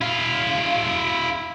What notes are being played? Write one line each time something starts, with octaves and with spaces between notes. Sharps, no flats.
E4 F5